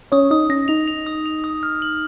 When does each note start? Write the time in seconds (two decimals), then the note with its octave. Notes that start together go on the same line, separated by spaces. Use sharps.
0.12 C#4 C#5 D#6
0.31 D#4 D#6
0.50 C#4 A#6
0.68 D#4 F7
0.88 F7
1.06 D#6
1.26 F7
1.44 D#6
1.63 F6
1.82 F#7